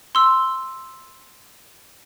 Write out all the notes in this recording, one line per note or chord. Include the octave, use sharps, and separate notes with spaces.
C6 E6